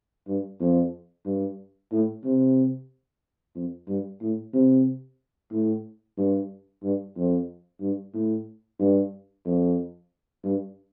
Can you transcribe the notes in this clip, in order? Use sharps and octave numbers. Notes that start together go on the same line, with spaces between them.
G2
F2
G2
A2
C3
F2
G2
A2
C3
A2
G2
G2
F2
G2
A2
G2
F2
G2